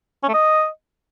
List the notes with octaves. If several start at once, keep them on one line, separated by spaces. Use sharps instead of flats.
C#4
A3
D#5